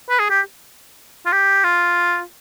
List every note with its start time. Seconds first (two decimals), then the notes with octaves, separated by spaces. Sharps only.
0.10 B4
0.19 G#4
0.30 G4
1.26 F4
1.32 G4
1.64 F4